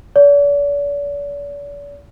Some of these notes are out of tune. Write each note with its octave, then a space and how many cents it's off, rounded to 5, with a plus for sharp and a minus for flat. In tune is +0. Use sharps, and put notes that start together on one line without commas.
D5 -45